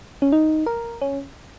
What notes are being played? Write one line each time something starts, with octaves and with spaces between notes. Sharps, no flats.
C#4
D#4
A#4
C#4